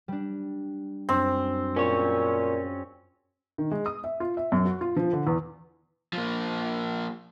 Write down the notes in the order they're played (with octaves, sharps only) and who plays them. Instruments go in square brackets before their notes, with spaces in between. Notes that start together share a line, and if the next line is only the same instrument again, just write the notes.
[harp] G3 D4
[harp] F#2 D4 [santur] C4
[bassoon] A#2 [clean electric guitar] C#4 C#5 [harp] G#4
[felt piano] D#3
G#3
D#6
E5
F4
E5
F#2
F#4
F4
F3
D3
E2
[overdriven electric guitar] F3 A#3